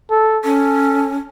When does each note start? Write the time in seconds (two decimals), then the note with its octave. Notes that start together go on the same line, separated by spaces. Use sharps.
0.11 A4
0.44 C#4 A4